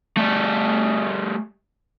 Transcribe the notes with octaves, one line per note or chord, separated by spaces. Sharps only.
G3 A3